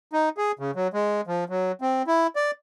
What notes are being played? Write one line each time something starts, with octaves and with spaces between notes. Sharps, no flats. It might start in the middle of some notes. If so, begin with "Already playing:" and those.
D#4
G#4
C#3
F#3
G#3
F3
F#3
C4
E4
D5